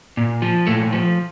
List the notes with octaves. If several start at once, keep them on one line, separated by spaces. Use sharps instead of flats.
A#2
F3
A#2 A3
F3